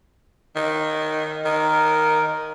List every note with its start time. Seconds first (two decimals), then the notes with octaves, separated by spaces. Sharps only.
0.56 D#3
1.45 D#3 A#4